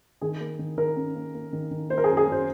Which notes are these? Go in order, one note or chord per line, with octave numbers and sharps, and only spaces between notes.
D#3 G#4
A#3
D#3
D#3 A#4
C#4
A#3
A#3
D#3
D#3
A#3 C5
A#4
G#4
F#2
G#4
F#2 C5